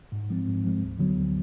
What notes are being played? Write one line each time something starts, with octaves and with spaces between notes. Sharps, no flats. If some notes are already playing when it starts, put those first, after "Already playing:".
G#2
F3 G#3 C4
G#2
F3 G#3 C4
D2
D3 F#3 B3
D2